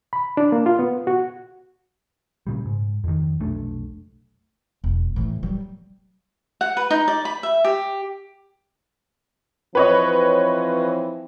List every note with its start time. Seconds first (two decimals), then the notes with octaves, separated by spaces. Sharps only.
0.13 B5
0.37 D4
0.52 A#3
0.66 F4
0.79 B3
1.07 F#4
2.47 A#2 C#3 G3
2.65 G#2
3.04 F2 D#3
3.40 F1 B1 A3 D4
4.84 E1
5.16 A2 E3
5.43 F#3 G3
6.61 F#5
6.77 B4
6.91 D#4
7.08 D5
7.25 B5
7.43 E5
7.64 G4
9.75 E3 F3 C4 B4 C#5 D#5